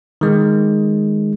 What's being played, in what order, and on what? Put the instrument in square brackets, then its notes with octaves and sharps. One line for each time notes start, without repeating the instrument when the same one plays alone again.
[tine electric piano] D#3 G#3